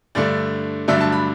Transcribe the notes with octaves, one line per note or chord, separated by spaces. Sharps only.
G2 D3 A3 D5
G2 D3 F#3 A3 D4 E5
A5
B5